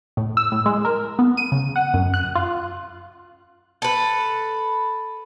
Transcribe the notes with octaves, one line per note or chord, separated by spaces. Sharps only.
A2
E6
A2
G#3
A#4
B3
D#7
C#3
F#5
F#2
F#6
F4
A4 B4